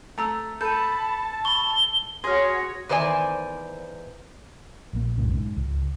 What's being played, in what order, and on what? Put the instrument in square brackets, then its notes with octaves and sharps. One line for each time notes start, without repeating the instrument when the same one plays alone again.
[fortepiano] A3 [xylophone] A5 A#5 E6
[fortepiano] A4 [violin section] A5 [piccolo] B5 [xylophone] G6 D#7
[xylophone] B5 C#6 [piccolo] G7
[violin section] F#4 C#5 [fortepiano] G#4 [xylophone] C6 F6 [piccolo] A#6
[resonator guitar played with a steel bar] E2 D#3 C5 D5 G#5
[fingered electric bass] A#1 A#3
B1 F#2 A2 C#3
G#2
C#2